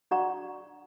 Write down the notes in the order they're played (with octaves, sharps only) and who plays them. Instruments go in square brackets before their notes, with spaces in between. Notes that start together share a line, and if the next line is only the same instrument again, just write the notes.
[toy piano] D4 F#4 D5 F#5 A#5 C#6